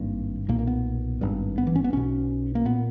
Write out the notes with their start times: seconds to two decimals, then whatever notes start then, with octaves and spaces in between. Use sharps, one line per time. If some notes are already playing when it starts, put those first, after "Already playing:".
Already playing: G#1 G2 A#3
0.49 B1 A#2 A#3
0.59 A#3
0.67 B3
1.21 G#1 G2
1.58 B3
1.67 E3
1.76 C#4
1.84 B3
1.93 B1 B2 C#4
2.55 A#3
2.65 A#2 B3